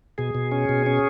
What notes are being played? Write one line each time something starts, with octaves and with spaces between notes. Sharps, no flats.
B2 G#4
B2
C#4
B2
C#4